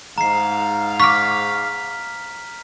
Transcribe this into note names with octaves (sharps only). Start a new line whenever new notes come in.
G#2 F5 A#5 C7
C#6 D6 F6 B6